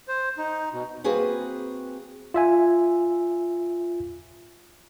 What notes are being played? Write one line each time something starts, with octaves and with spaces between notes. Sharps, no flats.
C5
D#4
B2
A#3 C4 F#4 G#4 B4
F4 E5 G#5